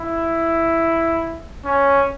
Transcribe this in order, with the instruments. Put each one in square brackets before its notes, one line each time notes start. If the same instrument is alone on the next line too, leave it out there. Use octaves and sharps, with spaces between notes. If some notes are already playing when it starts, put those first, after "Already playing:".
Already playing: [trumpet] E4
C#4